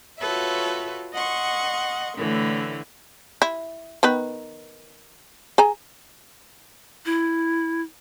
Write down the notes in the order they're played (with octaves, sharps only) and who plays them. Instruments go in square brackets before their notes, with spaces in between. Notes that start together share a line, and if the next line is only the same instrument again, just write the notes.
[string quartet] F4 F#4 A4 B4 C#5 E5
D#5 F#5 C6 C#6
A2 D3 E3 A3
[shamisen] E4
D#3 B3 B4
G#4 G#5 A#5
[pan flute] E4